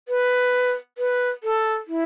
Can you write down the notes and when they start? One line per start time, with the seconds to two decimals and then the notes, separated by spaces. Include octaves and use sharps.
0.08 B4
0.98 B4
1.43 A4
1.88 E4